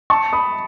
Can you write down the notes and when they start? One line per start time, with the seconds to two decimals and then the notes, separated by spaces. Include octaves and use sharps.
0.10 A5 C#6
0.33 B5 D#6